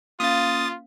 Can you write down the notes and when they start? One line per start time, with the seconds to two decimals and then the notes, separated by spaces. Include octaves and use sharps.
0.20 A#3 C#4 F4 F5 D#6 A6